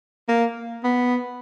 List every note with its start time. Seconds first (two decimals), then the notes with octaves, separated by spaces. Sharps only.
0.28 A#3
0.83 B3